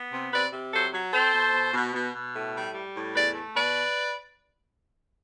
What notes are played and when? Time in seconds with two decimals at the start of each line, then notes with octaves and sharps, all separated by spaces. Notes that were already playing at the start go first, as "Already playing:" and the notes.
Already playing: B3
0.13 C3
0.32 C3 B4 D5
0.52 C3
0.72 F#3 A4 C5
0.93 F#3
1.14 C4 A4 C5
1.33 B2
1.53 B2
1.74 B2
1.94 B2
2.15 B2
2.34 A2
2.55 G3
2.74 G3
2.95 A2
3.15 E2 B4 D5
3.34 A3
3.55 B2 B4 D5